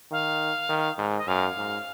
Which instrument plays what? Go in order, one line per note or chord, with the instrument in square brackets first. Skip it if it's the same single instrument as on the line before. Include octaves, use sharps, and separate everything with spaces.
[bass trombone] D#3 [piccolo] F5
[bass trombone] D#3
G#2
[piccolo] D#5
[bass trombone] F#2 [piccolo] F5
[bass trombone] G#2